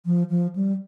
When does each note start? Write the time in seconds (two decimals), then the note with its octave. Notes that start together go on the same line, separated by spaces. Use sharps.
0.06 F3
0.30 F3
0.55 G3